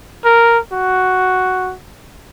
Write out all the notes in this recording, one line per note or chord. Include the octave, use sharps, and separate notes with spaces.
A#4
F#4